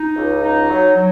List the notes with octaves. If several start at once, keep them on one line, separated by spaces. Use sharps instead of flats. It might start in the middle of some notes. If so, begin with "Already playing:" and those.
Already playing: D#4
C#2
D#4
F#3
F#3